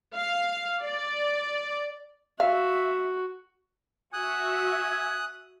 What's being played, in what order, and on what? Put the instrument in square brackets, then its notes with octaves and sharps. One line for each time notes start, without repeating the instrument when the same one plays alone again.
[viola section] F5
D5
[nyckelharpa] F#4 [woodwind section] E5 [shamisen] F5
[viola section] F#4 E5 [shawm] G#5 [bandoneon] D#6 F#6